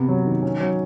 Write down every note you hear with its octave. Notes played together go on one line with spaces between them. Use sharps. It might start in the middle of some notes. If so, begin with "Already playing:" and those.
Already playing: C3 B3
F#3
D#3
C#4
F#3